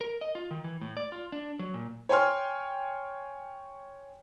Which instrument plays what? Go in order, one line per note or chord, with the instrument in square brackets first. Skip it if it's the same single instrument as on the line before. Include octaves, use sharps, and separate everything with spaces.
[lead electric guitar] A#4
D#5
F4
D#3
E3
A2
D5
F4
D4
F#3
A#2
[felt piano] C#5 G5 G#5 C6 F6